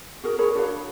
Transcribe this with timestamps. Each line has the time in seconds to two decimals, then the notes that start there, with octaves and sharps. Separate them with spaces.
0.23 F#4 G#4 A#4
0.38 G#4 A#4 C#5 B5
0.55 D4 F#4 C#5 F5